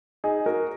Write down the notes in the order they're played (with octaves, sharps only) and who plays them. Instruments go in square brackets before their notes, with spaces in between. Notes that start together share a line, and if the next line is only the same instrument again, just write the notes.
[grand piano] D#4 G#4
F#4 A#4